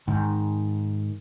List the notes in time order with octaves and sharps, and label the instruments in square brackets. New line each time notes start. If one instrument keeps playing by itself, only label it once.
[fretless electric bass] G#2 D#3